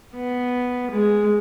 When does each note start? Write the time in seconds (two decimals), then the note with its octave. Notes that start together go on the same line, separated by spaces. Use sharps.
0.15 B3
0.91 G#3